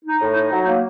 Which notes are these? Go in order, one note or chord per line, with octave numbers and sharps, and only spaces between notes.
D#4
A2
D#4
F#3
A#3